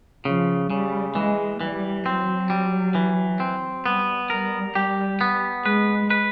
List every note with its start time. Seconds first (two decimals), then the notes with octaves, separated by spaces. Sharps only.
0.25 C#3 F3
0.70 C#3 G3
1.15 E3 G#3
1.60 E3 G3
2.06 F#3 C4
2.50 G3
2.95 E3
3.40 C4
3.86 G3 B3
4.30 G3 A#4
4.75 G4
5.21 B3
5.66 G#3 B4
6.10 B4